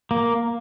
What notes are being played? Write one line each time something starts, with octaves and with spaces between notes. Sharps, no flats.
A#3